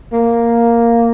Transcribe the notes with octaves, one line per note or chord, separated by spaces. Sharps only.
A#3